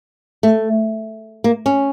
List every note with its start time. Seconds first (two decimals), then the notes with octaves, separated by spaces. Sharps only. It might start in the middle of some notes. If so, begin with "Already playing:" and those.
0.43 A3
1.44 A#3
1.66 C#4